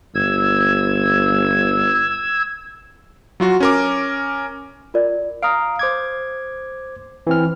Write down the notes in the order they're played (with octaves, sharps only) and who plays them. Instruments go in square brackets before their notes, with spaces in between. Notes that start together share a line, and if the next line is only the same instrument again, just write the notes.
[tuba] G1 [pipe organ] E6 G#6
[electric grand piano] F#3 F4 F#4
C#4 A#4 D6
[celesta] F4 A#4 D5
[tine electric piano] F5 A#5 [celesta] D#6 F6 D7
[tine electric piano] C5 D6 G#6
E3 C4 F6